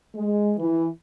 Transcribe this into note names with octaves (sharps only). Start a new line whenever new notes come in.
G#3
E3